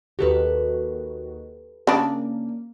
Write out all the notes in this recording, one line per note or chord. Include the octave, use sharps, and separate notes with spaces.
D#2 D#3 F#4 G4 A4 B4
C#3 A#3 D4